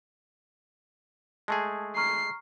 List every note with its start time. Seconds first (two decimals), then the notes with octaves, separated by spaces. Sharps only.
1.48 G#3 A3 G#4 A5
1.97 A#5 C#6 F6 C7